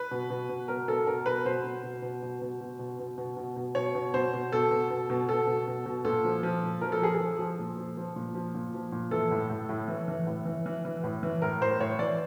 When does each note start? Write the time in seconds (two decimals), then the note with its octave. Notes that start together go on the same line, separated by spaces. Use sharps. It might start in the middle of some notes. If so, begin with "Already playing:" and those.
Already playing: B4
0.11 B2
0.30 B2
0.49 B2
0.68 B2 A#4
0.88 B2 A4
1.07 B2 A#4
1.26 B2 B4
1.45 B2 C5
1.64 B2
1.83 B2
2.02 B2
2.23 B2
2.41 B2
2.61 B2
2.79 B2
2.99 B2
3.18 B2
3.37 B2
3.56 B2
3.75 B2 C#5
3.95 B2
4.14 B2 C5
4.33 B2
4.52 B2 A4
4.71 B2
4.90 B2
5.10 B2
5.29 B2 A4
5.47 B2
5.68 B2
5.86 B2
6.05 A#2 A4
6.25 F3
6.43 F3
6.63 A#2
6.81 F3 A#4
6.92 A4
7.02 F3 G#4
7.14 A4
7.20 F3
7.39 F3
7.59 A#2
7.77 F3
7.97 F3
8.16 A#2
8.35 F3
8.54 A#2
8.74 F3
8.92 A#2
9.11 E3 A4
9.31 A2
9.50 A2
9.69 A2
9.88 E3
10.08 E3
10.27 A2
10.46 E3
10.66 E3
10.85 E3
11.03 A2
11.23 E3
11.42 A2 A#4
11.61 A2 C5
11.80 A2 C#5
11.99 E3 D5